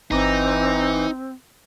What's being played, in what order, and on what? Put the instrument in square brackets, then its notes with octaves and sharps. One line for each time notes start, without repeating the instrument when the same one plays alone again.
[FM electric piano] G1 A#5 D6 [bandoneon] E3 [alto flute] C4 [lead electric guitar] D#4